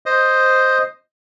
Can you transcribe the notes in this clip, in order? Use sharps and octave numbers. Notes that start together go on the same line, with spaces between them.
C5 D#5